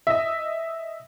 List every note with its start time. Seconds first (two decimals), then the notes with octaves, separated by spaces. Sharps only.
0.07 D#5 E5